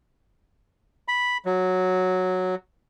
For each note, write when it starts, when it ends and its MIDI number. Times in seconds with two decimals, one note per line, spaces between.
1.08 1.37 83
1.45 2.55 54